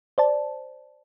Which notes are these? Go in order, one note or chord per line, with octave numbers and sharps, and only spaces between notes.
C5 D5 A5